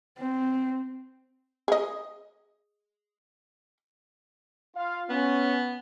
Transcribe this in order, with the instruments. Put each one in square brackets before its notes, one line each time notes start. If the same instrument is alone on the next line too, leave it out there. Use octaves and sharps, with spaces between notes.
[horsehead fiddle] C4
[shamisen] G#4 D#5
[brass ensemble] F4 F5
[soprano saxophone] B3 [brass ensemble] C#4